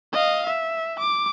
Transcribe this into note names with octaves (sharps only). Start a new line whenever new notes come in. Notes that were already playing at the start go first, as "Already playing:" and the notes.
D#5 F5
E5
D6